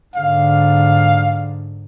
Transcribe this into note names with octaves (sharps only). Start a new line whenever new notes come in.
G#2 D3 F5